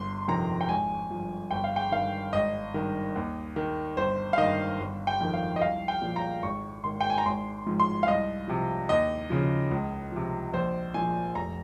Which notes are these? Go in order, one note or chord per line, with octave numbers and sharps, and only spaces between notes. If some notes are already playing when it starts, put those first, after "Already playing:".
Already playing: G1 C6
F2 C3 D#3 A#5
G5
G#1 G#5
G2 F3
G1 G5
F5
G5
G2 D#3 F5
G#1 D#5
G2 D#3
D#2
D#3
G1 C5
F5
G2 D#3 D#5
G1
G5
F2 D#3
F5
D#5
C2 F5
G5
A#2 F3
A#5
G#1 C#6
G#2 D#3 C6
G5
G#5
A#5
G#1 C6
G#2 F3
C6
F5
C2 D#5
C3 F3
D#2 D#5
C#3 F3
C#2
C3 F3
A#1 C5
A#2 F3 G#5
F1 A#5